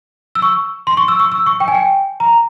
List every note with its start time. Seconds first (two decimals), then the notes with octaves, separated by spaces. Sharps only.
0.35 E6
0.42 C#6
0.87 C6
0.97 C#6
1.08 E6
1.20 C#6
1.32 E6
1.46 C#6
1.60 G5
1.68 G#5
1.75 G5
2.20 A#5